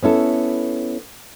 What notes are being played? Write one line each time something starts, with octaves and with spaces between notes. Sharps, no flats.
B3 C#4 E4 A4